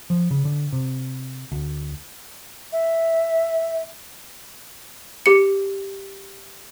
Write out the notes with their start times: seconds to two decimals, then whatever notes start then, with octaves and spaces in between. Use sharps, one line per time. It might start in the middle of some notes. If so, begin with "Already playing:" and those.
0.10 F3
0.31 C#3
0.45 D3
0.73 C3
1.52 D2
2.72 E5
5.26 G4 C#7